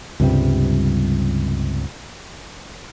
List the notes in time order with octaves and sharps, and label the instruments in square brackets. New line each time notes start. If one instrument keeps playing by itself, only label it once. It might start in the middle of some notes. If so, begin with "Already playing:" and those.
[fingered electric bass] C#2 G2 C3 G3